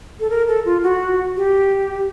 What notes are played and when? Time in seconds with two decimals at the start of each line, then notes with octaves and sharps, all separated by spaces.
0.20 A4
0.30 A#4
0.48 A4
0.65 F4
0.83 F#4
1.37 G4